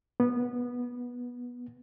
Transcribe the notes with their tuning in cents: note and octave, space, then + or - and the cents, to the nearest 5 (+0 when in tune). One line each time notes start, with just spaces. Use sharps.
B3 -15